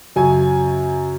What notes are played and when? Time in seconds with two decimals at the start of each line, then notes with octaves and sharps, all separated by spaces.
0.16 F#2 C#3 F#3 G#5